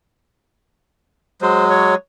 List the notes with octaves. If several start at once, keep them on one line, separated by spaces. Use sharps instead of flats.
F#3 G#3 C5
C#5